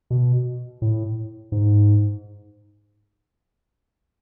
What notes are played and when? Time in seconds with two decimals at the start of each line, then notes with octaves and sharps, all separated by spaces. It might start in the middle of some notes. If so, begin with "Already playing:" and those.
0.10 B2
0.82 A2
1.52 G#2